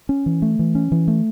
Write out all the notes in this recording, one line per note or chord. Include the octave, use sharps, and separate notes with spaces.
C#4
E3
A3
E3
C#4
E3
A3